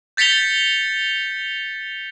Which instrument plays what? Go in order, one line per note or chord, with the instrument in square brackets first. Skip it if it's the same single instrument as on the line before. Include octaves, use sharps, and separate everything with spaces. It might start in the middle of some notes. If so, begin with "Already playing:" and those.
[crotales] G6 A6 B6 C#7 F7 G7